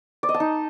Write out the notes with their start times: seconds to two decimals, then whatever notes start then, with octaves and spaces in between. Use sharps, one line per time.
0.23 D5
0.29 D#5
0.34 A5
0.40 D#4